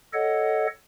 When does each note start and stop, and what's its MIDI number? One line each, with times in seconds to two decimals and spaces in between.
0.13 0.67 69
0.13 0.67 73
0.13 0.67 75
0.13 0.67 78